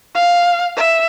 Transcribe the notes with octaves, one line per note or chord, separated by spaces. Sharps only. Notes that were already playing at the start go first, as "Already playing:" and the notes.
F5
E5